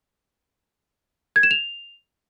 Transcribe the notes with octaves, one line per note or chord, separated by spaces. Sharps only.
G#6
E7
F7